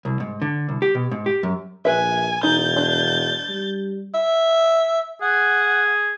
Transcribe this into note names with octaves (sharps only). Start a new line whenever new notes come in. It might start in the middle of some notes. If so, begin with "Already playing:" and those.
C2
G#2
D3
C2
G4
B2
G#2
G4
F#2
A#1 B4 E5 G#5
E1 D#4 G6 A6
D4
G3
E5
G#4 F#5